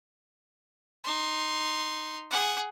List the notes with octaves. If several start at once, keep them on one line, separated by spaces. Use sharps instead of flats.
D#4 C6
G#4 F#5